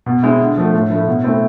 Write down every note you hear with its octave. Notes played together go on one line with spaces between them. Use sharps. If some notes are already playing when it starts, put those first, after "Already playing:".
B2
G#3 C4 E4
D3
F3 A3
A2
F3 A3 E4
B2
A3 C4 E4